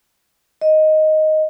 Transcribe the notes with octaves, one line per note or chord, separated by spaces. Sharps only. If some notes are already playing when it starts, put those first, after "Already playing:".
D#5